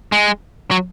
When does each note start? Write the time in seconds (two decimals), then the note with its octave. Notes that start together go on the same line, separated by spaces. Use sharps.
0.12 G#3
0.71 F#3